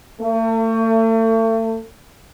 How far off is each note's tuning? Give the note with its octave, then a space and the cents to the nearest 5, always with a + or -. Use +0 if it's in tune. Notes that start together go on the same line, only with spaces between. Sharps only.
A3 +40